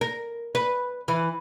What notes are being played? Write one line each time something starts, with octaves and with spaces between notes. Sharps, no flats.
A#4
B4
E3